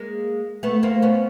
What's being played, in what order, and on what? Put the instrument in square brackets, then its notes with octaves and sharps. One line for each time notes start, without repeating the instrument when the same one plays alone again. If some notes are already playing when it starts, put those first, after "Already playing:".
Already playing: [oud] G#3 A#3
A3 B3
A#3 C4
B3 C#4